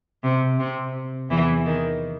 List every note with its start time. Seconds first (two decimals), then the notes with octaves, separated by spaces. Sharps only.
0.24 C3
0.59 C3
1.30 E2 E3
1.66 D#3